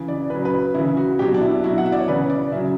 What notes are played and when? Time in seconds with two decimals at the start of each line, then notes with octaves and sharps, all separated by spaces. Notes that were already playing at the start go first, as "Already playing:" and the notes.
Already playing: C#3 E3
0.08 D5
0.30 C#3 F#3 B4
0.45 B4
0.74 C#3 E3 E4
0.97 F#4
1.19 B2 F#3 G4
1.34 D4
1.41 E4
1.63 B2 F#3 E4
1.78 F#5
1.86 E5
1.92 D5
2.00 C#5
2.08 C#3 E3 B4
2.30 D5
2.52 C#3 F#3 E5